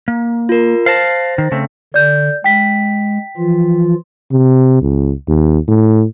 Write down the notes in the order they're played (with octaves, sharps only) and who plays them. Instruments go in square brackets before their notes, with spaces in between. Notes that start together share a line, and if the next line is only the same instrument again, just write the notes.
[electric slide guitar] A#3
[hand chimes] F4 A#4
[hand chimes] C5 A6 A#6 [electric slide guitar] F5 A5
[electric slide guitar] D#3
C#3 A3 C4
[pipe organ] D3 [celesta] D5 G6
[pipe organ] G#3 [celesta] G5 B6
[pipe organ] E3 F3 F4
[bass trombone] C3
C#2
D#2
A2